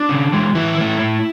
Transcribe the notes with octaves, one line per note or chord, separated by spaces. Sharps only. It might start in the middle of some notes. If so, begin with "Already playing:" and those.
Already playing: D4
C#3
E3 G#3
A2 E3 E4
E3 A3
A2